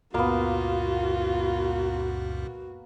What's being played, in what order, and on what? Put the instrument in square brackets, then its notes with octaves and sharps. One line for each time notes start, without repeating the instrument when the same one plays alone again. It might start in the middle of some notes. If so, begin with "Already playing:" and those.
[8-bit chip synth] C#2 F#2 A#2 [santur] A#3 B3 [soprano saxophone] F4 [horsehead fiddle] F#4